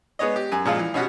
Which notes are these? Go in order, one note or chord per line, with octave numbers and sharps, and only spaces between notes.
G#3 B3 C#5 D#5
G4
F#2 G#5
A#2 F3 G#3 F4
E3
B2 C#4 F#4 G4